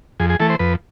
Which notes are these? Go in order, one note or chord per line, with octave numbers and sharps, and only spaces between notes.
F2 G#4
G#4
E3 A3 A4
C5
F2 B4